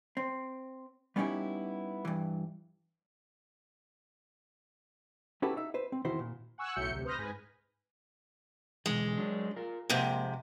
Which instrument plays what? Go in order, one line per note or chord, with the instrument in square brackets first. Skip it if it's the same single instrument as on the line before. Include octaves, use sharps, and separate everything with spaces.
[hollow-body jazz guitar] C4
G3 B3 C#4 D#4 E4 G4
G2 E3
C#4 E4 F#4 G4 A4 B4
D#4 E5
B4 C5
C4
E2 D#3 E4 F#4 C5 C6
A#2
[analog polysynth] F#5 G#5 C#6 E6 F#6
B1 A2 F#3 E5 G6 C#7
D2 C3
B4 C5 D#6 F6 G6 A#6
G#2 B4 G#5
[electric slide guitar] B2 D3 E3 [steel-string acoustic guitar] G#3
[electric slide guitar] F#3 D4
F4 A#4
[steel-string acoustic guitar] F2 G#2 C3 [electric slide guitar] A#3